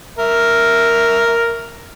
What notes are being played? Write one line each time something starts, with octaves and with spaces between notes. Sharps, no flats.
A#4 E5